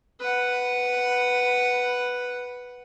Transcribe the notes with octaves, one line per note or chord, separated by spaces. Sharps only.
B4 F#5